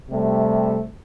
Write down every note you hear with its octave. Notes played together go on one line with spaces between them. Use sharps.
C3 G3 A3